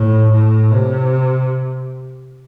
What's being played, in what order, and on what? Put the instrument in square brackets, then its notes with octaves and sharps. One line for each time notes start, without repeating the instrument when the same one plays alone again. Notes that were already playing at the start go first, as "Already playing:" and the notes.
Already playing: [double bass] A2
A2
C3